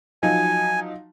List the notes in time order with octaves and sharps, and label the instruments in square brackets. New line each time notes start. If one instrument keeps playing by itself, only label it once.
[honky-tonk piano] F3 F#3 D#4 [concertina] G#5